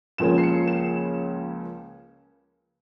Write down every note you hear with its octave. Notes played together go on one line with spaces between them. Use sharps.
C#2 C#3 F3 A#3 C#4 E7
C7
C#7
E7